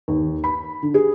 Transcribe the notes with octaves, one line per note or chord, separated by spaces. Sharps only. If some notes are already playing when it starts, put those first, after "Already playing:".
D#2
B5
D3
G#4